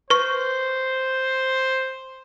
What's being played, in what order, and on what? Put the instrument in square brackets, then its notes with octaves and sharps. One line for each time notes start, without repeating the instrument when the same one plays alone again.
[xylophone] B4 C#6 [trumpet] C5